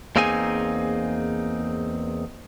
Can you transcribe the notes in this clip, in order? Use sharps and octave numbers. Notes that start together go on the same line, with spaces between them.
E2 A#3 C4 D#4 G#4 G#5